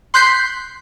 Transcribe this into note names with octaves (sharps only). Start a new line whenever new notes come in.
C6 F#6 G6 B6 C7